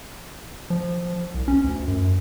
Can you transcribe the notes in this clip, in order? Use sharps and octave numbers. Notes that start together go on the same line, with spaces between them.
F3
C2
C#4
D2
F#2